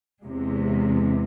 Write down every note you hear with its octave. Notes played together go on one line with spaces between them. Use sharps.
E2 C3 G#3